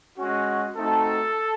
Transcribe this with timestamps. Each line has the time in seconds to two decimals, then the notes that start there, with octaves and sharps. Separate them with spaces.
0.18 G#3 C#4 F#4
0.76 A3 C4 D#4 F#4 A4